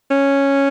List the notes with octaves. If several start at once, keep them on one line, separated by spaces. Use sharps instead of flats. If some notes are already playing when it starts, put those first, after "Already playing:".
C#4